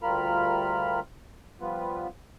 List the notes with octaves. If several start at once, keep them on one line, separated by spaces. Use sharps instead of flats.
D2 G3 F4 A#4 B5 F6
F3 G3 B3 F4 B4